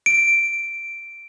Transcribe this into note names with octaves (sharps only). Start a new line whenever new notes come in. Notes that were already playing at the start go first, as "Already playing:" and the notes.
D7